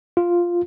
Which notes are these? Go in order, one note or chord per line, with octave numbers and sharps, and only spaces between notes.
F4